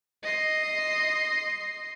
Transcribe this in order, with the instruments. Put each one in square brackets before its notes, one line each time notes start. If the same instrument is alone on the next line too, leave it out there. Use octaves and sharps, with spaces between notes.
[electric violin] D#5 C6